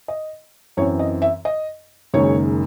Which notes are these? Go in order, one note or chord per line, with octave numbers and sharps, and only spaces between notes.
D#5
F#2 E3 C4 C#5
D#5
E5
D#5
F#1 F#2 D#3 G#3 C#5